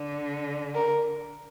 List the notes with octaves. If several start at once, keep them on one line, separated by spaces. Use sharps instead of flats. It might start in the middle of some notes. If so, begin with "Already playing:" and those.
Already playing: D3
A#4